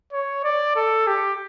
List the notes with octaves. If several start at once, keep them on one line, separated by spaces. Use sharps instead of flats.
C#5
D5
A4
G4